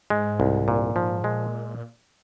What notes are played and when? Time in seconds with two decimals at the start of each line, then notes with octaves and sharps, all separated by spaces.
0.10 G#2 G#3
0.40 C2
0.68 A#2
0.96 F3
1.23 A#2 G#3